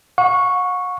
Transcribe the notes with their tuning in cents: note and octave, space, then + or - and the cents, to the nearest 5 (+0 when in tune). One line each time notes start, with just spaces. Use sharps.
F#5 -40 C#6 +0